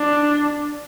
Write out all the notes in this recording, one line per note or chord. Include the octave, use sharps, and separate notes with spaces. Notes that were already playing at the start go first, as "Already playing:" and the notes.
Already playing: D4